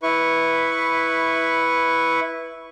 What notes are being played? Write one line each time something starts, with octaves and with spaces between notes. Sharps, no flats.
E4 B4 C#6